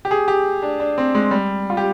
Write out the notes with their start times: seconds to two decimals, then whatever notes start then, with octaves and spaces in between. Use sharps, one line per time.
0.05 G4
0.11 G#4
0.28 G4
0.63 D4
0.80 D4
0.98 C4
1.15 G#3
1.31 G3
1.70 F4
1.77 G4